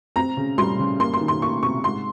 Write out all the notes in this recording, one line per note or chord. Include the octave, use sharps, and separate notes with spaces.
C4 A#5
C#3
G3 C6
C#3
A#3 C6
C6
D#3
C6
A#3 C#6
C3 C#6
G#2 C6